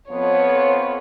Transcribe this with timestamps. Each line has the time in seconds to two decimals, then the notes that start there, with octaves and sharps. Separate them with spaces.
0.10 F2 F3 B3 C#5